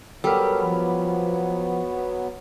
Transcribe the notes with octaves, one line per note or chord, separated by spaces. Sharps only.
F#3 G3 B3 A4 A#4
F3 B5